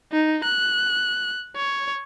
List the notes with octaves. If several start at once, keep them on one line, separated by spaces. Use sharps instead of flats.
D#4
F#6
C#5